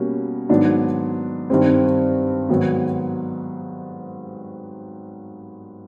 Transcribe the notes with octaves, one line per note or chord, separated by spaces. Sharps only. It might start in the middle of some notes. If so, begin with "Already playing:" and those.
Already playing: B2 G3 A#3 C#4
G#2 D#3 F#3 B3 D4
G2 D#3 G3 C4
G#2 D#3 F#3 B3